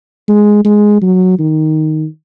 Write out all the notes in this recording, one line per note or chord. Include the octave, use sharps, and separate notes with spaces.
G#3
G#3
F#3
D#3